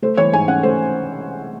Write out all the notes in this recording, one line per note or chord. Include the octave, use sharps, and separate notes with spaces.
A3 C5
E3 C#5
G#2 G#5
C#4 F#5
A3 C5